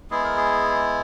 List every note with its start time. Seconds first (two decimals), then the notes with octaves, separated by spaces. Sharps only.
0.10 G#3 B3 E4 G#4
0.24 A#4
0.37 G#4